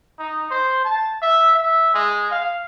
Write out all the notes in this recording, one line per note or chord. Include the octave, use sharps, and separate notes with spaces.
D#4
C5
A5
E5
E5
G#3
F5